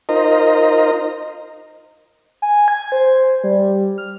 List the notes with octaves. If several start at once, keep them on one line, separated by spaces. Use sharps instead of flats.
D#4 F4 A#4 C5 D#5 A#5
G#5
G#6
C5
G3
F6